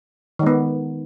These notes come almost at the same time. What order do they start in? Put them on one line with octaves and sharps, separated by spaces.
D#3 G#3 B3